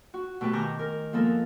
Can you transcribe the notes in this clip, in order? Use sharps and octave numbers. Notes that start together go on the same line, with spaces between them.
F#4
B2 A3 G4 B4
D#3 G#5 A#5 D6 G6
A#4
F3 G#3 A#3 B3 A4 A#4